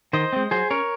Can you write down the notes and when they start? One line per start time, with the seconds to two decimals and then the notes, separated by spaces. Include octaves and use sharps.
0.13 D#3 C5 D#5
0.33 G#3 C4
0.51 F#3 G#4 C5
0.70 C#4 A#4 C#5